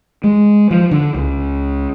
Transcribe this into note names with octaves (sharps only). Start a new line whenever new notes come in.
G#3
F3
D3
C#2